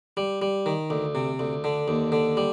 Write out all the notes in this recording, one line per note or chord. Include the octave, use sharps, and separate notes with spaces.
G3
G3
D#3
D2
C3
D2
D3
D#2
D3
G3